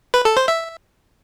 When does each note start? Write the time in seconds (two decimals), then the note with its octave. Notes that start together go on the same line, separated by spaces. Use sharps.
0.14 B4
0.25 A4
0.37 C5
0.48 E5